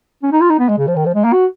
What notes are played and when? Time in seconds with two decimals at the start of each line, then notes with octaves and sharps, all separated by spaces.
0.23 C#4
0.32 D#4
0.41 F4
0.50 D#4
0.59 B3
0.68 G#3
0.78 C#3
0.87 F3
0.96 D#3
1.06 F3
1.15 G#3
1.24 A#3
1.33 F#4